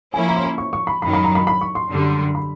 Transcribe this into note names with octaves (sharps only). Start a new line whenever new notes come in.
F3 A#3 C#4 E4 G#5
A#5
C6
B5
C#6
C#6
B5
F#2 D#3 F#3 B5
B5
A#5
B5
B5
C#6
C6
F#2 D3 G3
B5